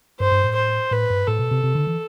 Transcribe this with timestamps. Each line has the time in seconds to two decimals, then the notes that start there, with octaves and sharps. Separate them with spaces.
0.20 G2 C5
0.32 G2
0.44 A2
0.55 C5
0.92 A2 B4
1.10 G2
1.27 A2 A4
1.39 B2
1.51 C3
1.63 C3
1.75 D3
1.87 E3